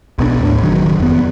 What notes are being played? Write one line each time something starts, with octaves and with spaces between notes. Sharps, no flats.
B1 B2 F#3 D4
D#2 A2
F#1 D#2 D#3 F#3
F2 B3